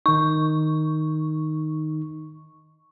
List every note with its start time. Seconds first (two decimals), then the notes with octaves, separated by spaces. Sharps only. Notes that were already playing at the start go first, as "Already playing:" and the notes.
0.06 D#3 D#4 C#6